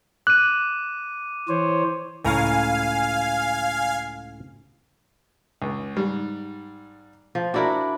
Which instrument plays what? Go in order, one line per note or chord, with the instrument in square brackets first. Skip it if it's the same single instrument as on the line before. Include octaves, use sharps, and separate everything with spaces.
[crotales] D6 D#7 [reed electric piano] F#6
[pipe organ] E3 C5 C#5
[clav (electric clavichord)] C#2 A2 A#5 [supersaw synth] F5 G#5
[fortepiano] C#2
G#2 G3
[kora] F3
[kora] D4 E4 A#4 [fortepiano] F#4 D5